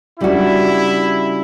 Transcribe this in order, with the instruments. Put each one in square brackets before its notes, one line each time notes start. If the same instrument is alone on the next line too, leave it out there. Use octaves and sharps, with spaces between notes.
[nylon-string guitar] C#3 G3 D4 F#4 [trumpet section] E4